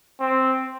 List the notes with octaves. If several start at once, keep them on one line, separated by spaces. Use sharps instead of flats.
C4